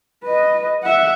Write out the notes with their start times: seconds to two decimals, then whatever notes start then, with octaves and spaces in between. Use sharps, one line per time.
0.24 B4 D#5
0.83 E5 F#5